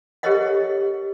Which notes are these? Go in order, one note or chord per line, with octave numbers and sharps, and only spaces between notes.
G4 A4 A#4 C#5 D#5 F#5